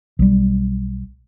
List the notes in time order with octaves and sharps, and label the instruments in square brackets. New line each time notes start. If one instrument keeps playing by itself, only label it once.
[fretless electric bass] B1 G3